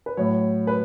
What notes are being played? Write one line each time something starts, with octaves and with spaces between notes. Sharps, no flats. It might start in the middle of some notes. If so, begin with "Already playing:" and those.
B4
A2 F#3 C#5
B4